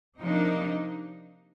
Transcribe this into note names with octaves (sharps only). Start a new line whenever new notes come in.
C3 F3 A#3 D4 D#4